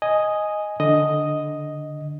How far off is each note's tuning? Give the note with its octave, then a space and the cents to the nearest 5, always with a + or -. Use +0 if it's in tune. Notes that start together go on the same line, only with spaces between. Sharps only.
D#5 +0 G#5 +0
D3 +0 D#5 +0